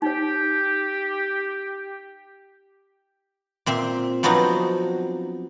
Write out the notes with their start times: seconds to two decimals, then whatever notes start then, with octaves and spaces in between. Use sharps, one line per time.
0.02 D#4 G4 C#5
3.66 A#2 C4 E5 C6
4.23 F3 F#3 B3 C4 D4 D#4